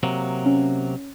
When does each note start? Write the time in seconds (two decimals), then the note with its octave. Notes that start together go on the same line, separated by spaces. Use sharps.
0.03 C3 F#3 A#3
0.46 C#4